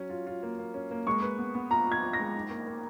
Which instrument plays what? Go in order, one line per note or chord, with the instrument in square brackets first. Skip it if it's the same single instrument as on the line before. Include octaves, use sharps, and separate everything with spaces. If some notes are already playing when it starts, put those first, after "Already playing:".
Already playing: [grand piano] F#3 C#4
F4
F4
A#3
A#3
C#4
A#3
[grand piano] G#3 [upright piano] C#6
[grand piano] B4
B3
B3
[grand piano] F4 [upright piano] A#5
[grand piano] F4 [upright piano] G#6
[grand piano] F4
[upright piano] A#6
[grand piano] G#3
D#4
A#3
A#3